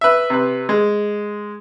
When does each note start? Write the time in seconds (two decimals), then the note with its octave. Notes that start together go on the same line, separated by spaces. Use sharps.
0.01 B4 E5
0.30 C3 B4
0.69 G#3